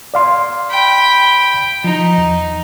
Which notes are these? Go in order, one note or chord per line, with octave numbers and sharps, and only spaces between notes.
D5 F5 C6
G5 B5
F3 D#4
E2